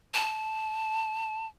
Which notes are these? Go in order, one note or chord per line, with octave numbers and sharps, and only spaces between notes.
A5